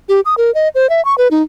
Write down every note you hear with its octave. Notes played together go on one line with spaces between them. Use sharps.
G4
D#6
A#4
D#5
C5
E5
C#6
B4
D#4